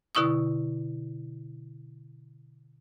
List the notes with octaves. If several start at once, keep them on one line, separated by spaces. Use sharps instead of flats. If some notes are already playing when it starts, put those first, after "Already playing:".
B2 D3 E4 C#6 D#6